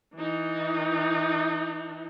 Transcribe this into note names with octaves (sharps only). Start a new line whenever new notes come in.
E3 D#4